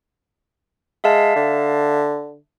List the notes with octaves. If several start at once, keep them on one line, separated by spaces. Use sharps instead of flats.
G#3 E5 F5 A5
D3